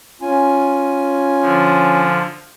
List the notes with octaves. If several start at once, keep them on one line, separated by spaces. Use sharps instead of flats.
C#4 F4 G#5
D3 F3